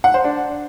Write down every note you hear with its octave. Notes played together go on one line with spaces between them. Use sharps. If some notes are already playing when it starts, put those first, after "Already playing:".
F#5
C5
D4